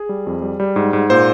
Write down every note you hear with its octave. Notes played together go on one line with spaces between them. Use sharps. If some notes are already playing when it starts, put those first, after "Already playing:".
Already playing: G#4
G3
F2
G3
G3
G#2
G#2
A#2 C5